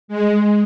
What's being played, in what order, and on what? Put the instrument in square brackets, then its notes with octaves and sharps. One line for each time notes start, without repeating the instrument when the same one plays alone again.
[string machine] G#3